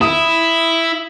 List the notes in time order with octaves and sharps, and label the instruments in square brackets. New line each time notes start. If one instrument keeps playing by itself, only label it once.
[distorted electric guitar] E4 [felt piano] D#6